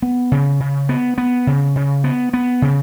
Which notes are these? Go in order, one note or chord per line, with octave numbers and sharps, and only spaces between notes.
B3
C#3
C#3
B3
B3
C#3
C#3
B3
B3
C#3